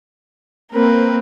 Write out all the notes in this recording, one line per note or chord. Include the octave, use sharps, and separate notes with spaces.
A#3 C4 A#4 B4